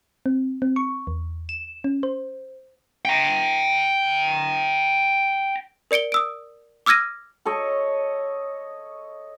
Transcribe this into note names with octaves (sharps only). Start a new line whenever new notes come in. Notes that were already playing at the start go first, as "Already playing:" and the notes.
C4
C4
C#6
E2
E7
C#4
C5
G5 A#5
A#4 D5 C#7 D7 G7
D#6 E6 D7
D6 E6 F6 G#6 A#6 D#7
A4 C#5 D#5